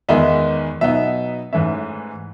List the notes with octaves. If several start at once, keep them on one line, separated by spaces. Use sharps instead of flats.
E2 D#3 G#3 B3 D#4 E5
B2 F#3 B3 D#4 E5
G#2 E3 A3 C#4 E5